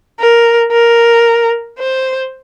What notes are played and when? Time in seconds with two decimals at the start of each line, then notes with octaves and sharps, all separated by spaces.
0.20 A#4
0.72 A#4
1.79 C5